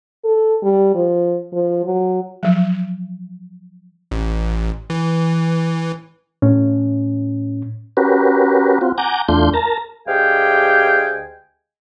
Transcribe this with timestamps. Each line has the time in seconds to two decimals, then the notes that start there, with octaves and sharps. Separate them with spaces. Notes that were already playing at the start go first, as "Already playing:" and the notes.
0.24 A4
0.63 G3
0.95 F3
1.53 F3
1.85 F#3
2.43 F3 F#3
4.11 A1
4.90 E3
6.42 A2 C#4
7.97 C#4 F#4 G4 A#4 B4
8.81 C4 F4 F#4
8.98 F#5 G#5 A#5 D6 G6
9.29 E2 A3 D4 F4 C6 G6
9.54 A#4 A5 A#5
10.07 D2 G#3 G4 F5 G5 G#5